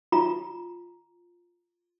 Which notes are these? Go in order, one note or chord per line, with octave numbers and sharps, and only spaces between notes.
F4 A#5